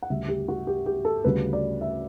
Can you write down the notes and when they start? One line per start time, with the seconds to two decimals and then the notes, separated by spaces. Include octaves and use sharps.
0.02 F#5
0.10 D2 C#3 G3 E5
0.28 G4
0.48 F#4
0.67 G4
0.86 G4
1.05 A4
1.24 D2 C#3 G3 B4
1.53 D5
1.81 E5